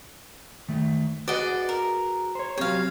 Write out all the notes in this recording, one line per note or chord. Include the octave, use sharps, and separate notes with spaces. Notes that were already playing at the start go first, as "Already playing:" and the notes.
D#3 A3
F#4 G#4 B4 D5 D#5 F#5
A#4
C5 C#5
F#3 C4 G4 C#5 F5